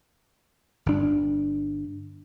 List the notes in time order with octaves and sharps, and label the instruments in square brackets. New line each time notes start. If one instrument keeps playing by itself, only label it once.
[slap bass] G1 D4